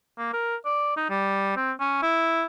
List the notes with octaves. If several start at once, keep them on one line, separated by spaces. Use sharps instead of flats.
A#3
A#4
D5
D#4
G3
C4
C#4
E4